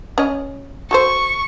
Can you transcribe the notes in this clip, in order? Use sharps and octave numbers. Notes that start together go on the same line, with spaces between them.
C#4 C#5 D#5
F#4 A4 C5 C#6